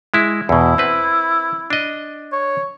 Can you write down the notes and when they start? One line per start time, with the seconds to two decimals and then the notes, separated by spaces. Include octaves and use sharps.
0.14 G#3 E4
0.49 E2 B2 E4
0.78 C4 B4
1.70 D4 D#5
2.32 C#5